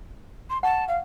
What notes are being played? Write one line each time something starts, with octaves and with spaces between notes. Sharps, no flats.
C6
F#5 A5 C#6
F5